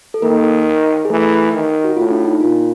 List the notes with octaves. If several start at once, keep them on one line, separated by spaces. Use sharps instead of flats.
A4
D#3 A#3 A#4
G#4
E3 A3 A4
D#3
F#4
A2 F4
D4
D#4
A#2 F4